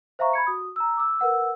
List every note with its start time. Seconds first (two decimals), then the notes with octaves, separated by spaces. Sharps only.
0.19 C5 E5 F5 A#5 C#6
0.33 B5 G#6 C#7
0.47 F#4 D#6
0.76 A#5 E6
0.97 D6 E6
1.19 A#4 B4 F#5 E6